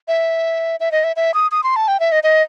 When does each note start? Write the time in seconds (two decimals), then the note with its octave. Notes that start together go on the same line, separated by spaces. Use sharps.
0.08 E5
0.80 E5
0.92 D#5
1.04 E5
1.16 E5
1.34 D#6
1.52 D#6
1.64 C6
1.76 A5
1.88 G5
2.00 E5
2.12 D#5
2.23 D#5